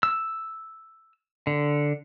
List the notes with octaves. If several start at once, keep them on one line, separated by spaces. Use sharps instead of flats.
E6
D3